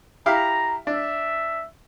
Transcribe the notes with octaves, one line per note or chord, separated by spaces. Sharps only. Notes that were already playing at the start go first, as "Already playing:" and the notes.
E4 G4 F5 A#5
D4 E5